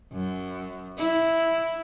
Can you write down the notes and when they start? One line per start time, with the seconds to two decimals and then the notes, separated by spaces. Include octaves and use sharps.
0.13 F#2
0.98 E4